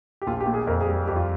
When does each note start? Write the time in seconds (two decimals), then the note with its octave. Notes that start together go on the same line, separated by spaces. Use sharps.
0.22 G4
0.27 A#1 F4
0.41 G4
0.46 A#2
0.54 G#4
0.67 F2 A#4
0.81 G#4
0.88 G3
1.07 F2 G4
1.16 F4